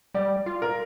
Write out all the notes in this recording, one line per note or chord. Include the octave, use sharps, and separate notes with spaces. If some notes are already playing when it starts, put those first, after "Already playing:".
G3 D5
F4
A#4